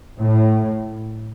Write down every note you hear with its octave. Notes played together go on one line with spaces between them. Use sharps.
A2